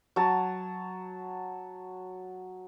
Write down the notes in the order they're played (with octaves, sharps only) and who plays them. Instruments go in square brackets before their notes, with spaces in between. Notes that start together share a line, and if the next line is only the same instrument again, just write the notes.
[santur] F#3 A5